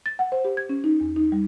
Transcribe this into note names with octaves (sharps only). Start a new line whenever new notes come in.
A6
F#5
C5
G4
G#6
C#4
D#4
E2
D#4
G3